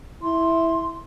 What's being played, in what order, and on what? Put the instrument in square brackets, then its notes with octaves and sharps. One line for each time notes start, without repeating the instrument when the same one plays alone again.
[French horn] E4 [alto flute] C6